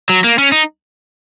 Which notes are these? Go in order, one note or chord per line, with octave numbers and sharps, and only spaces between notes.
F#3
A#3
C#4
D#4